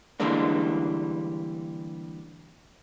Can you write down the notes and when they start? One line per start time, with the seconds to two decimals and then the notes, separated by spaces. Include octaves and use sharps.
0.20 D3 E3 G3 G#3 A#3 D4